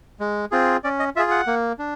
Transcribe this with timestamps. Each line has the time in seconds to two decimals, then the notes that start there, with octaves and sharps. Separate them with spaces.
0.20 G#3
0.51 C4 F4 G#4
0.84 C#4 D5
0.99 D#5
1.16 F4 E5
1.19 G#4
1.31 F#5
1.47 A#3
1.79 D4